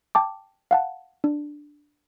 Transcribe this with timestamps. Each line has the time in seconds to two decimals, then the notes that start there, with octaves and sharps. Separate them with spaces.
0.15 G5 A5 D6
0.71 F5 F#5 A5
1.24 D4